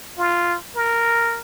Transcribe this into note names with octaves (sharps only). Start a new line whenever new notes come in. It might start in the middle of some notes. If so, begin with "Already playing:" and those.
F4
A#4